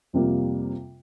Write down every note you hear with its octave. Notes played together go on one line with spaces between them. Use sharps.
F2 C3 G3 A#3 F4